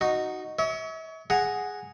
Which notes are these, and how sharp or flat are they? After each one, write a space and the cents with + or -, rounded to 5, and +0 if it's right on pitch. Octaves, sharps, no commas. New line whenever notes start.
D#4 -5 F#4 +0
C#5 +30 E5 -40
G#4 +0 F#5 +0 A#5 +0